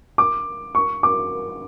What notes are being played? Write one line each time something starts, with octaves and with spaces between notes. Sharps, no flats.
D6
C#6
D6